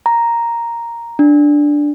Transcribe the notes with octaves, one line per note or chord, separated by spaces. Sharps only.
A#5
D4